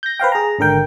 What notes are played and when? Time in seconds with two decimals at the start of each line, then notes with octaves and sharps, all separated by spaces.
0.03 G6 A#6
0.20 B4 C5 F5 G5
0.32 G#4 A#5
0.59 G#1 D3 A#4 G5